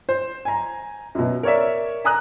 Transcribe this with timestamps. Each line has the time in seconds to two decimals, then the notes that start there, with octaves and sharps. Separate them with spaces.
0.09 C5
0.45 G#5 A#5
1.15 F#2 B2
1.43 A#4 C#5 D5 E5
2.05 G#5 A#5 D#6 F#6